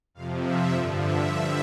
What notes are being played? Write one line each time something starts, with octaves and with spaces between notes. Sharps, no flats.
F2 C3 F3 F5
E5
G2 D3 F3
E5
G2 D3 F3 E5